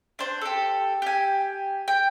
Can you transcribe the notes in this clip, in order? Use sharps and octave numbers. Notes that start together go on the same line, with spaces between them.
D4 C5
G4 A4
G4 G#5
G5